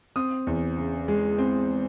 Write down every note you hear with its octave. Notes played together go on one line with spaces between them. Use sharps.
C4 D#6
E2
C#3
G#3
C4